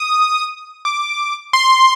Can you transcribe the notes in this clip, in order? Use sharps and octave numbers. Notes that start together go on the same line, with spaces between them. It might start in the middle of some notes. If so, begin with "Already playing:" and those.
Already playing: D#6
D6
C6